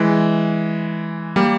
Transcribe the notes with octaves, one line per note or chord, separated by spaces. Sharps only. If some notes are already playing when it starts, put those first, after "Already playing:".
Already playing: E3 G#3
G3 A#3